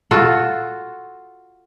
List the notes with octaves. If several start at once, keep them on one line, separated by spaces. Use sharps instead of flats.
F4 F#4 A4